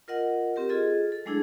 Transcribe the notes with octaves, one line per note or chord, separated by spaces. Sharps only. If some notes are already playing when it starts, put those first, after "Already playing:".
F4 A#4 D#5 F#5
C4 G4 A#4
F4 G#4 A4 D#5
A4
F#3 G#3 A3 D4 E4 G#4